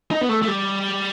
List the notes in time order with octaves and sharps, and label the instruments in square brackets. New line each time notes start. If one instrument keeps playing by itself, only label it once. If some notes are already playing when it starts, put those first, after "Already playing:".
[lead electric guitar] D#4
B3
A3
A3
G3